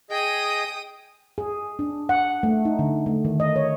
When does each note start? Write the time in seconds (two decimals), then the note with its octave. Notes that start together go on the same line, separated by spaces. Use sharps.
0.10 G#4 D#5 G5 D#6
1.38 G#4
1.79 D4
2.09 F#5
2.43 A3
2.65 D#4
2.79 D3
3.06 A3
3.25 D#3
3.40 D#5
3.56 C#5